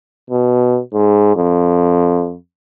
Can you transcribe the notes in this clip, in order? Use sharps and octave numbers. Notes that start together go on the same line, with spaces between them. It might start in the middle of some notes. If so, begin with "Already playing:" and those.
B2
G#2
F2